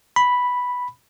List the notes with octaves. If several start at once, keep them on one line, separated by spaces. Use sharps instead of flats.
B5